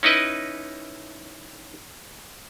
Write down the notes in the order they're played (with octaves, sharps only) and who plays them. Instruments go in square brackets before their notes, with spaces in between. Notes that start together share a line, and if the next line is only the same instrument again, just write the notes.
[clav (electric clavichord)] C#4 D#4 E4 B4 D#5